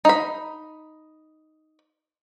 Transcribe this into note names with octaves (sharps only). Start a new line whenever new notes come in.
D#4 B5